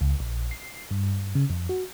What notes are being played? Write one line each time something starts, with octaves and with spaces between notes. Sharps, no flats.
C#2
A#1
C7
G2
C#3
F2
F#4